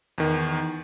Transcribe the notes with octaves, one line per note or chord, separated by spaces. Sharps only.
E2 D#3